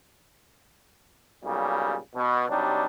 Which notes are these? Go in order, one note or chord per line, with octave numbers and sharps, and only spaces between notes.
B1 A#2 C#3 G3
B2
C3 F#3 G3 D4 D#4